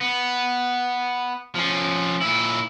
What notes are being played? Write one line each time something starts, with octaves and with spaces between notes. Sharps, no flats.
B3
F3 C#4
A#2 E4